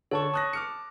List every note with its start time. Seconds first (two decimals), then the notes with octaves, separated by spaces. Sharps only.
0.11 D3 C#5 A5 C#6
0.34 A5 D#6 F#6 A#6
0.53 D6 F6 C#7